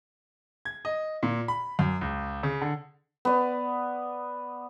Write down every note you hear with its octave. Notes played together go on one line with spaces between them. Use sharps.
G#6
D#5
A#2
B5
F#2
C#2
C#3
D3
B3 D5